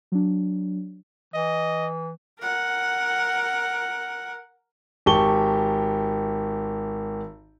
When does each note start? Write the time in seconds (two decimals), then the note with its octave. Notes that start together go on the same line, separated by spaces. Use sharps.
0.12 F#3 D4
1.34 E3 D#5
2.40 A#4 F#5
5.06 G#1 G4 A5 C#6 G7